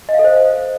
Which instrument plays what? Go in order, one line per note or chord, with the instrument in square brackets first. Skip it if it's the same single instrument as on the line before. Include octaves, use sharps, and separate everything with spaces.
[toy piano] D#5
F5
A4
C5